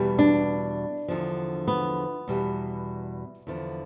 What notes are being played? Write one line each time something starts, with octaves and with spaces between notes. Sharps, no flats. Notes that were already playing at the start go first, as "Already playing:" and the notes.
Already playing: E2 B2 G3
D4
E2 D3 F3
B3
E2 B2 G3
E2 D3 F3